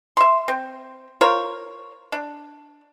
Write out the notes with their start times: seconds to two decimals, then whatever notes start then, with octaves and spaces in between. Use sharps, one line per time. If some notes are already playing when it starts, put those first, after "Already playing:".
0.17 E5 C6
0.48 C4
1.21 F4 A#4 C5 C#5
2.12 D4